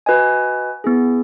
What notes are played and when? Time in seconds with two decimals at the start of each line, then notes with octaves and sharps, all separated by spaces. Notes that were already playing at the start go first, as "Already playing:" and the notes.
0.06 F#4 B4 D#5 G#5
0.84 B3 E4 G#4